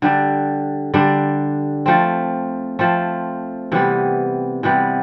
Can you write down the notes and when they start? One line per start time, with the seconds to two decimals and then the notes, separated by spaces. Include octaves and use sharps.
0.02 D3 G3 D4
0.94 D3 G3 D4
1.86 F3 A3 C4
2.79 F3 A3 C4
3.72 C3 E3 G3 B3
4.63 C3 E3 G3 B3